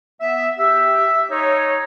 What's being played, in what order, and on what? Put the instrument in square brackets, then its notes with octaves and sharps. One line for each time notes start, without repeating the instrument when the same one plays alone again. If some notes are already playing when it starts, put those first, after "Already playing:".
[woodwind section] B3 E5
[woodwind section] G4 [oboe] E5
[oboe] D#4 [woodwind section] C#5